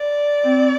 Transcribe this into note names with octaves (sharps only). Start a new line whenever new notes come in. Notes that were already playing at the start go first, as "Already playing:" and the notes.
Already playing: D5
C4